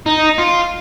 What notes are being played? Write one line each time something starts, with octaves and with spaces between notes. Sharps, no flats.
D#4
F4